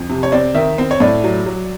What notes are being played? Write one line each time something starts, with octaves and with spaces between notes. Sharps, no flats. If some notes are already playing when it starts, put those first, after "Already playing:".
Already playing: F2
C3
C#5
C4 D5
D#3 E5
C4
C#5
A2 D5
F#3
F#3